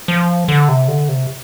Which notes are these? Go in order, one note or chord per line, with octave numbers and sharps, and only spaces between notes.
F3
D3
C3
D3
C3